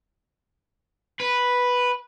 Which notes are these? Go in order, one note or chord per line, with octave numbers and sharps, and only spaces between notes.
B4